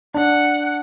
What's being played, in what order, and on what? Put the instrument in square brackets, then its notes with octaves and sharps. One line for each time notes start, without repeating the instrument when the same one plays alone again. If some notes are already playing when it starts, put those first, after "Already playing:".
[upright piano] D4 [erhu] F#5